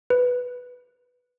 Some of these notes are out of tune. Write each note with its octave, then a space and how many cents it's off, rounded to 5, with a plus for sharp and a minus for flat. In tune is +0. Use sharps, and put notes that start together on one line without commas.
B4 +0